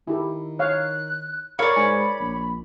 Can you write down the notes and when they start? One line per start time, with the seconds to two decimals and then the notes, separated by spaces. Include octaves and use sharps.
0.07 D#3 E4 G4 A4
0.59 C#5 F5 F#6
1.59 A#4 C#5 D5 F5 B5
1.76 G#2 G#5
2.20 A#1